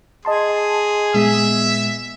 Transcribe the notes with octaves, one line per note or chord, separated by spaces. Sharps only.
G#4 D#5 A5 C6
A#2 G#3 B3 E5